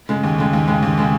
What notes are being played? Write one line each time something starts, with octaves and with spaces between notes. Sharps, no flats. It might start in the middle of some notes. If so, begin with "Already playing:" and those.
C#3 G#3
D#2
C#3 G#3
D#2
C#3 G#3
D#2
C#3 G#3